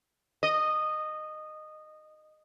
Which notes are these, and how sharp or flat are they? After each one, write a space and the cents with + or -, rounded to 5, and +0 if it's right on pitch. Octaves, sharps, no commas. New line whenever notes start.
D#5 -15